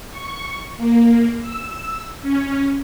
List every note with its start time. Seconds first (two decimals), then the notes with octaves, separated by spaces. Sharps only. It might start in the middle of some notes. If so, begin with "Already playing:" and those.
0.10 C#6
0.77 A#3
1.42 E6
2.22 C#4